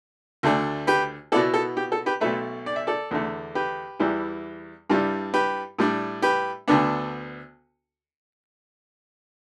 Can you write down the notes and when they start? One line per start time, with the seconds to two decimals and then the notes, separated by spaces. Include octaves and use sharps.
0.43 D2 D3 A3 D4
0.87 G4 B4
1.32 B2 B3 E4 A4 D5
1.54 A4
1.77 G4
1.92 A4
2.06 G4 B4
2.21 B1 B2 A3 B4 E5
2.66 D5
2.76 E5
2.87 A4 D5
3.11 E2 D3 A3
3.55 G4 B4
4.00 E2 E3 G3 E4
4.90 G2 G3 E4
5.34 G4 B4
5.79 A2 G3 D4
6.22 G4 B4
6.68 D2 D3 B3 D4